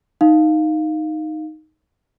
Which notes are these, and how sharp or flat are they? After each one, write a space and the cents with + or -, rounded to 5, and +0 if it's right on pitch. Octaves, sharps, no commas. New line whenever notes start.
D#4 +0 F5 +0